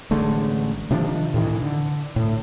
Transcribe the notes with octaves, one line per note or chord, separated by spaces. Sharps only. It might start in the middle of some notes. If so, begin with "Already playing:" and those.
A1 D3 G#3 A3
C3 D#3 F3 D4
A2 C3 D#3 E3
D3
A2